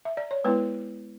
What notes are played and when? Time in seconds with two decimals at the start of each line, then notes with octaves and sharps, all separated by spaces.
0.05 E5
0.17 D5
0.31 C#5
0.44 G#3 B3 E4 B4